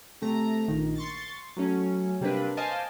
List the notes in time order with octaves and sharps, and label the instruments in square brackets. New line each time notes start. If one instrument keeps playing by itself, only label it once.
[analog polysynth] C3 A3 A#5
A#1 D#3
C6 C#6 A6
F#3 A3 C#4
C3 G3 A#3 C4 D4 B4
C5 D#5 F5 G#5 A5 D6